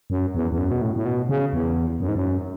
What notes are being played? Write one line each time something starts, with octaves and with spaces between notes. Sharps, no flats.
F#2
E2
E2
F#2
B2
A2
A2
B2
C#3
E2
F#2
G#2
F#2